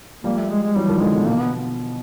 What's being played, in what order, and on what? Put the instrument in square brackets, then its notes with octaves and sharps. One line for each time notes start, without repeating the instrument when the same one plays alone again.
[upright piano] F3 G3 [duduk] A#3
[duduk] A3
G#3
G#3
[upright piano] E3 F#3 [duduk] G3
[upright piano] D#3 F3
[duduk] G3
[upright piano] D3 E3 [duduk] G#3
[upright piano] B2
[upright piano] B2 [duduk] A#3
[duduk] B3